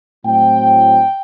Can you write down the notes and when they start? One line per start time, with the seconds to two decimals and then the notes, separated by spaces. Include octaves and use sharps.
0.25 A2 F#3 C4 G5